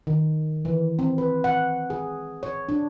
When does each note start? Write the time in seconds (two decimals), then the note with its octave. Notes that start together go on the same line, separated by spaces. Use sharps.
0.07 D#3
0.65 E3
0.99 C4
1.18 B4
1.44 F#5
1.90 G#4
2.43 C#5
2.69 D4